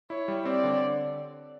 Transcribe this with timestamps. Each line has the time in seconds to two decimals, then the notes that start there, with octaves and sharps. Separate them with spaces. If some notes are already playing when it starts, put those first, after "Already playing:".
0.10 E4 C#5
0.28 G3
0.45 C4 D5
0.64 D3